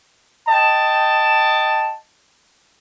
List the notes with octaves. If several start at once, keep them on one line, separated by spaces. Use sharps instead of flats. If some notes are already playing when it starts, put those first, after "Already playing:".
D#5 G5 A5